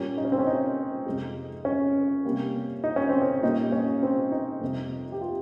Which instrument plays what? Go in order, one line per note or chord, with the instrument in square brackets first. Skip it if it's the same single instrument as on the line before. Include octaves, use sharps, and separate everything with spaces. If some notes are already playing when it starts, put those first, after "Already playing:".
Already playing: [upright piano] A#2 G3 A#3 C#4
D#4
C#4
C4
C#4
D#4
F2 C3 F3 G#3
C#4
C3 G3 A#3
D#4
C#4
C4
C#4
A#2 G3 A#3 D#4
C#4
C4
D#4
F2 C3 G3
G4
F4